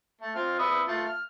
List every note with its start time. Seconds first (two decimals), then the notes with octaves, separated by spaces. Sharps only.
0.21 A3
0.35 C4 F4 F6
0.59 B4 E5 D#6
0.88 A3 F4
1.05 F6